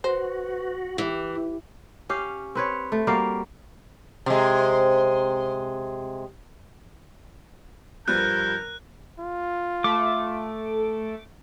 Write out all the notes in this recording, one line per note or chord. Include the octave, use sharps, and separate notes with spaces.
F#4 B4 C5
E3 G4
C#4 G4 F5
C4 B4 C#5
A3
G3 A#3 F#4 F5
C3 G#3
G2 F3 G3 A#4 F#6 G6
F4
A3 D6